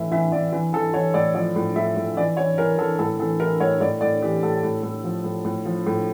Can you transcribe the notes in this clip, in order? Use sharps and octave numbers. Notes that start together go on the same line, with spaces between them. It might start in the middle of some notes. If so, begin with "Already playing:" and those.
Already playing: A2 E3 E5
E3 E5
E3 D5
E3
E3 A4
E3 C#5
A2 D5
F3 D5
A2
A2 E5
A2
E3 D5
E3 C#5
E3 A#4
E3 A4
A2 A4
E3 A4
E3 A#4
A2 C#5
A2 D5
A2 D5
E3 G4
A2 A4
A2
A2
F3
A2
A2
F3
A2